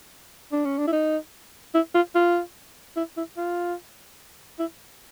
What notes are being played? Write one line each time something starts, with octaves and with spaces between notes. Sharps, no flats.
D4
C#4
D4
E4
D#4
E4
F4
F4
E4
E4
F4
E4